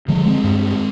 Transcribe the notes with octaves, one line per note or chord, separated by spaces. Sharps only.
D3 F3 G#3
G#3 C4
G2